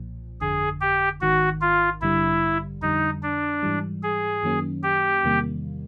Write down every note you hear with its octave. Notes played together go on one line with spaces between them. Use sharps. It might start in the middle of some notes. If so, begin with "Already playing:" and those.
Already playing: B1 A#2 F3
G1 F2 D3 G#4
G4
G#1 G#2 D#3 F#4
F4
A1 G2 D3 G3 E4
F2 D3 G3 D#4
D4
G#2 E3 G3
G#4
F#2 D#3 F#3 A#3 C#4
G4
E2 C3 D#3 G3 A#3